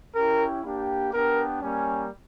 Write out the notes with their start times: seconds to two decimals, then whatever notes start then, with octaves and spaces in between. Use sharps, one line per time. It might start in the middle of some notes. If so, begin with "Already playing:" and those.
0.15 C#4 E4 G4 A#4
0.63 A#3 D4 G4
1.12 B3 D4 G4 A#4
1.60 G3 A#3 C#4